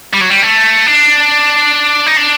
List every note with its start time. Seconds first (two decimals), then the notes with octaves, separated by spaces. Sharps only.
0.14 G3
0.21 F#3
0.30 G3
0.43 A3
0.86 D4
2.07 D#4
2.17 D4